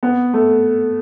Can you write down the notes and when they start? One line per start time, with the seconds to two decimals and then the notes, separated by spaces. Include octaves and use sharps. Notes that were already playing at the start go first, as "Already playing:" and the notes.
0.03 B3
0.34 A3